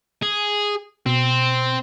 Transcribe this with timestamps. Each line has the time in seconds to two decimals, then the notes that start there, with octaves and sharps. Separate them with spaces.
0.22 G#4
1.06 B2 C4